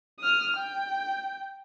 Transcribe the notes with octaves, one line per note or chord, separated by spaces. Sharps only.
D#6 F6
G5